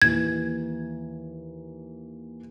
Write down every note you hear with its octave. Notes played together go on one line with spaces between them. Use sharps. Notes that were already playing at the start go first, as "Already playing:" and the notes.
D#2 E3 G#6